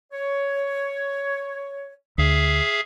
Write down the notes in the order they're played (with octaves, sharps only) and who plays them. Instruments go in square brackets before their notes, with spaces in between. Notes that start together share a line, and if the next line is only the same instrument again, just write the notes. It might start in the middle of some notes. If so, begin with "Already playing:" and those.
[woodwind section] C#5
[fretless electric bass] D2 [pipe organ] G#4 E5 F5